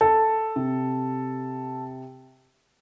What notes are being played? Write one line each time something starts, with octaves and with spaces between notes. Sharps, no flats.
A4
C3